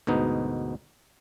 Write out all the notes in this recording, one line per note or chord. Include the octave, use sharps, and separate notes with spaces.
D2 G#2 B2 B3 D#4